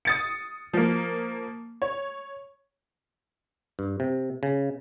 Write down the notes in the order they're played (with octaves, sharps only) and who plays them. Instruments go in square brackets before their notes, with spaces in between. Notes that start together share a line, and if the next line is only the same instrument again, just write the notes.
[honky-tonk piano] D#6 A6 C#7
F3 A#3
C#5
[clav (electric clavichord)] G2
C3
C#3